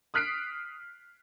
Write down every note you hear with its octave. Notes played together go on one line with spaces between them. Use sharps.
D#6 F6 F#6 B6 C7 D7